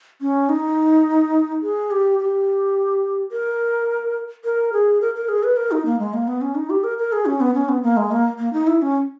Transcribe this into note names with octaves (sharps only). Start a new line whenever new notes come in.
C#4
D#4
G#4
G4
G4
A#4
A#4
G#4
A#4
A#4
G#4
B4
A#4
D#4
A#3
G#3
A#3
B3
C#4
D#4
G4
A#4
A#4
G#4
C#4
B3
C#4
B3
A#3
G#3
A#3
A#3
D#4
E4
C#4